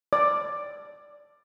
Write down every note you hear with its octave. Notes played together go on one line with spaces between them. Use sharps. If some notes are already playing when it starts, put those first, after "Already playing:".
D5